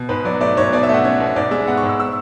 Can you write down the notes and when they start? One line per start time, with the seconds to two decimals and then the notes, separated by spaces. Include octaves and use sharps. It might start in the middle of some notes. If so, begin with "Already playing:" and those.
Already playing: B2
0.09 G#2 B4
0.25 F#3 D5
0.40 A3 D5
0.57 G#2 C#5
0.72 B2 D5
0.83 E5
0.89 A3
0.94 F#5
1.04 C#4 C#5
1.20 B2
1.36 G#2 D5
1.51 G#3 E5
1.67 B3 F#5
1.78 C#6
1.83 G#2
1.89 E6
2.00 E6